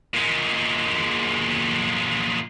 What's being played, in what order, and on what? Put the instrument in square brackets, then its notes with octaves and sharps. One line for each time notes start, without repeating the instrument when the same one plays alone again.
[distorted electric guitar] A#2 G#3